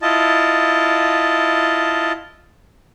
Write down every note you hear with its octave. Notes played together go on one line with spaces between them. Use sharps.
E4 F4 D#5 A5